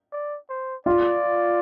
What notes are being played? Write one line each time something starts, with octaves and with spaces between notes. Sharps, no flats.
D5
C5
F4 D5